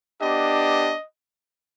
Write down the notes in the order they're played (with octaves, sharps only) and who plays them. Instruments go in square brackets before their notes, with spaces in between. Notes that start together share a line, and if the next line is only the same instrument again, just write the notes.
[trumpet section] B3 D4 G4 D#5